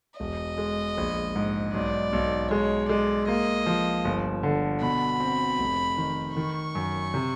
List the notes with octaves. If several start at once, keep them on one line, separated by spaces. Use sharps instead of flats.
E1 D#5
G#3
A#1
G#2
B1 D5
B1
G#3 C#5
G#3 D5
A#3 D#5
F3
G1
D3
B2 B5
C4
F1
D#3
D#3 C#6
F#2
C3